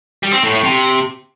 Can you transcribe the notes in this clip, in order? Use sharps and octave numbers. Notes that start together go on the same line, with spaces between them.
G3
C4
A2
A2
C3